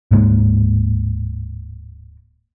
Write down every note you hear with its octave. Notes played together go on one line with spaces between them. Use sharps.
D1 G#2 G#3 A#3